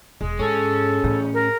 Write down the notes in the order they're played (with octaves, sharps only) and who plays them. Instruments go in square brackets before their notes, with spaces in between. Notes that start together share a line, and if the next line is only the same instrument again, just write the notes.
[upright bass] E1 [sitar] G#3
[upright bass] G#2 [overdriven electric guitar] C#4 [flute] A4
[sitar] E2 [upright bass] A2
[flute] A#4